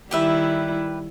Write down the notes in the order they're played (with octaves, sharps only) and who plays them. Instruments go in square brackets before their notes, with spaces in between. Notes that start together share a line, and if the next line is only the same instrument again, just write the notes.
[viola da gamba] D#3 G3 E4 [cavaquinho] G4 B4 E5